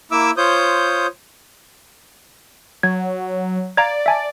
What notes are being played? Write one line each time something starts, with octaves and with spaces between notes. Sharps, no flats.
A#3 E4 E5 D6 E6
F4 C5 C#5 D#6 G6
F#3 G#6
D5 F5 A#5 G#6
E5 G#5 A5